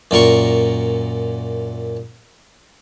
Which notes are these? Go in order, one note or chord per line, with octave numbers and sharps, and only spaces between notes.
F#2 A#2 A#4 C#6